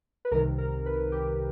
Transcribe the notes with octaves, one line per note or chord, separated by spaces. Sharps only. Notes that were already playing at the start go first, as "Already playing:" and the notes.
B4
C2 C3 D#3 A#4
A#4
B4
G4